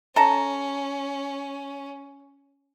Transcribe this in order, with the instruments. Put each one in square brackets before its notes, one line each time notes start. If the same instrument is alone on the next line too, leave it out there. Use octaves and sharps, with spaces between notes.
[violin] C#4 [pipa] A4 A5 A#5